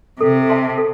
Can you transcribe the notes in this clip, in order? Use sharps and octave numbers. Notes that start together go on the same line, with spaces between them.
C3 A4
E5 A5 C6
A4